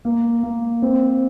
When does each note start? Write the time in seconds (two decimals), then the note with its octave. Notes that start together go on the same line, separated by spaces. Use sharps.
0.05 A#3
0.43 A#3
0.82 C4